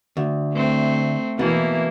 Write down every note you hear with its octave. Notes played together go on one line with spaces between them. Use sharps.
D2
A3 C4
B2 E3 A#3 E4